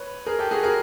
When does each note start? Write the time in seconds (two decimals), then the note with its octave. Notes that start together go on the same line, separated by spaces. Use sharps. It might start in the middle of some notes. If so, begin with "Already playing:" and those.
Already playing: B4 C#5
0.26 G#4 A#4
0.39 G4 A4
0.51 F#4 G#4
0.63 G#4 A#4